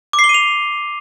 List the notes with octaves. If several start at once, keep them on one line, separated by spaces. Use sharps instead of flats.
D6
C7
G7
D#7
F7